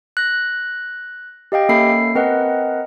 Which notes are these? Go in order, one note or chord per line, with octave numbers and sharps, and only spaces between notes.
F#6 A#6
G4 D#5 F5 G5
A#3 C#4 A4 E5 B5 C7
C4 A#4 B4 D#5 F#5